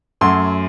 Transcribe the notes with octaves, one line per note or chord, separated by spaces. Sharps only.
F#2 F#3 A3 C6